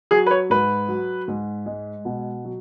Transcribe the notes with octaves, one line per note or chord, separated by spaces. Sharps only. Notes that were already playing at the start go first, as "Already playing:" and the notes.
F#3 G#4
B4
C#5
G#2 B4
F#3
G#2
G#3
B2
F#3